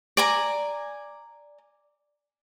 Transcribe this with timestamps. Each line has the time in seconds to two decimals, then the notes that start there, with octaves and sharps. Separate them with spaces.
0.17 D5 G#5 A#5